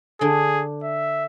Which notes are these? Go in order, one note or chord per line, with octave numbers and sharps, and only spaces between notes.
D3 D4 G#4
E5